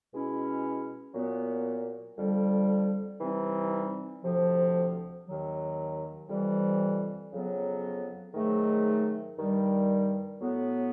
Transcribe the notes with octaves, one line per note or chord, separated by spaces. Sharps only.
B2 G#3 C#4 E4
A#2 F#3 B3
F2 D3 G3
C3 E3 G3 C4 D#4
D2 C3 F3
D#2 D#3 F#3
F2 C3 E3 G3
F2 C#3 F#3 B3
G#2 D#3 F#3 A3
G2 D#3 G3
A2 F#3 B3